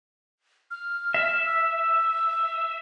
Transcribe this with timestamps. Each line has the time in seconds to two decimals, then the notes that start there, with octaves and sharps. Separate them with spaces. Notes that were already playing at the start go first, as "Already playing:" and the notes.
0.71 F6
1.14 E5
1.46 E6